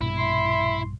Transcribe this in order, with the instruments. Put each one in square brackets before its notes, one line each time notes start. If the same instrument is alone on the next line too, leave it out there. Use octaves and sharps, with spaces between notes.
[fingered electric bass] A#1 G2 B2 [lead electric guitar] E4
[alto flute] E5 [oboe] C6